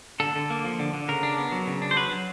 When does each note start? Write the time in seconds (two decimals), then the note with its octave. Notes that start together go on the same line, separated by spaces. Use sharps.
0.20 D3 A4
0.35 D3
0.50 A#3
0.64 F3
0.79 D3
0.94 D3
1.09 C#3 A#4
1.23 D4
1.38 B3
1.52 F#3
1.67 C#3
1.82 D4
1.91 C5
1.96 F#3 B4
2.12 F#3